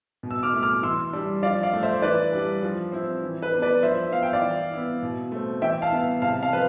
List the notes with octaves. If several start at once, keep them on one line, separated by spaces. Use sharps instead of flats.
B2
E6
D6 F6
A3 E4
D6 F6
E3 C6 E6
G3 D4
F3 D5 F5
D5 F5
A3 D4
C5 E5
E3 B4 D5
G3 D4
F3
C4 E4
E3
B4
B3 D4
B4 D5
F3 C5 E5
B3 E4 F5
G5
D5 F5
E3
B3 E4
B2
A3 C4
E3 E5 G5
F5 A5
B3 E4
C3 F5 A5
F5 A5
F3 C4 B4